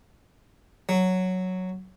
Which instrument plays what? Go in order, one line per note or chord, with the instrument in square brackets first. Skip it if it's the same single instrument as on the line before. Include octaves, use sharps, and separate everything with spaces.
[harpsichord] F#3